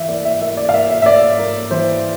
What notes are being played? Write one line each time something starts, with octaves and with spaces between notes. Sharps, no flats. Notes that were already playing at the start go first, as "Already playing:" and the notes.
Already playing: E3 E5 F5
A#3 D5
E5
A#3 E5
D5
F5
A#3 E5
E5
E5
A#3 D5
A#3
E3 C5